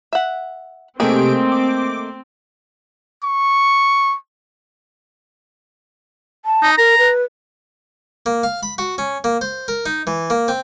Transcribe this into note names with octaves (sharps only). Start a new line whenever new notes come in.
E5 F#5
C3 D#3 A3 A#3 C4 G4 G#4 D7
D6
C#6
A5
D#4
A#4 A#5
B4
A#3
F5
B5
F#4
C#4
A#3
C5
A#4
D#4
E3
A#3
C4